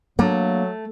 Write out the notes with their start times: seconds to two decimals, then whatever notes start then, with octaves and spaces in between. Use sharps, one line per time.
0.19 F#3 A3 A#3 D4